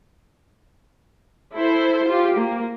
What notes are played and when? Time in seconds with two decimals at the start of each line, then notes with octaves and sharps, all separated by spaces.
1.55 E4 A4 C5
2.08 F4 G4
2.38 A#3